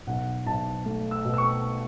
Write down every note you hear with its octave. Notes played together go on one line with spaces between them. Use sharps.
B1 F#5
B1 A5
A3
E6
B2
E6
C#6